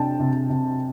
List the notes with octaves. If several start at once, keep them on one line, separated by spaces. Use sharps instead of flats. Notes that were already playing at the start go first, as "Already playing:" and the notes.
Already playing: C3 D4 G5 A5
C3
C3